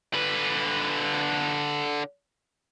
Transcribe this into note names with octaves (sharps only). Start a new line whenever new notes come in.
D3 B4